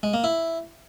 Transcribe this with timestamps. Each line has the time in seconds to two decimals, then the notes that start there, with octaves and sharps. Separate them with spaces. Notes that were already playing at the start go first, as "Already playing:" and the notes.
0.03 G#3
0.14 A#3
0.24 E4